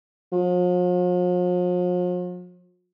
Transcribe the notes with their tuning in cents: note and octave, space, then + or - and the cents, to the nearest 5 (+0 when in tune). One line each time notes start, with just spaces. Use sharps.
F3 +45